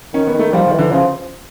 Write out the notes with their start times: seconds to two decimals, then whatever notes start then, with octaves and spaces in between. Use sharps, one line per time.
0.14 D#3 C#4
0.27 B3
0.34 D#3
0.39 A3
0.53 F3 G3
0.66 D#3
0.72 E3
0.79 D3
0.92 C#3 F3